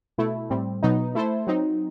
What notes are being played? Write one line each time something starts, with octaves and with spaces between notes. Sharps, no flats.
B2 A3 E4
A2 G3 C4
B2 F#3 B3 D#4
A3 E4 A4 C5
F#3 C4 D#4